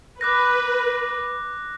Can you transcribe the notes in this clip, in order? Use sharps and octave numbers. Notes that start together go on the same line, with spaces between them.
B4 D6 F#6 A#6